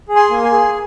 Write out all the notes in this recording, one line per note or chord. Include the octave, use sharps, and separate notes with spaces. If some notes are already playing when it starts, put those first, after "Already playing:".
G#4
G#5 C6
A#3
G#5 C6
G#4